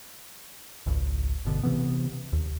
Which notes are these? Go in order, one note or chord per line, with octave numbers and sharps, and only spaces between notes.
G#1 C#2
G1 B2 D3
C3 E3 B3
D#2